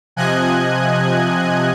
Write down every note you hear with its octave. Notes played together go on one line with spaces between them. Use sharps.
C3 F3 D#5 G#5 F#6 G#6